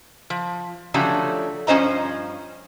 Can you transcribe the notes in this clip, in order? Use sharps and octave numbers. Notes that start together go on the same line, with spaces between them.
F3
D3 F3 F#3 A3 C#4 G4
G2 F3 C#4 C5 D#5 A#5